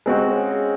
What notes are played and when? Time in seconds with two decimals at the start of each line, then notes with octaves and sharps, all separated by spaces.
0.06 C3 G#3 C4 F#4
0.31 C#3